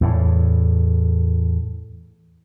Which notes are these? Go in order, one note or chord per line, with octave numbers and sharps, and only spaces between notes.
E2 A2